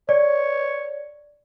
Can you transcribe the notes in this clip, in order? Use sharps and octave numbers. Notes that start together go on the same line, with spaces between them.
C#5 D5